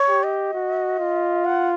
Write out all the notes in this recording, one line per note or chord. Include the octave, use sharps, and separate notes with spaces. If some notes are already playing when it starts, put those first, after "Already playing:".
Already playing: C#5
G4
D#5
F#4
F4
F#5